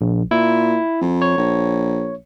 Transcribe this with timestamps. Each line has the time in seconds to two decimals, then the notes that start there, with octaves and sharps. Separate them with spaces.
0.01 A#1
0.31 A#2 E4
1.01 F2
1.22 C#5
1.38 A#1